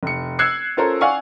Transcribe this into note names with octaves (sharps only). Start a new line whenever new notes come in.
F1 C#7
E6 F#6 G#6 C7 C#7
C#4 F4 A4 A#4 C5
D5 F5 F#5 G#5 C#6